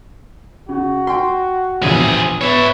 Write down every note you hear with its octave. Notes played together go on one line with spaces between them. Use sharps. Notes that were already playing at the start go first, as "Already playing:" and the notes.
C#3 F#4
G5 C6
A#1 E2 G2 C3 G#4
B3 B4 C#5 E5